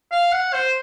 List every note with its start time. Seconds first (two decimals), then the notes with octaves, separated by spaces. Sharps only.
0.12 F5
0.32 F#5
0.53 C5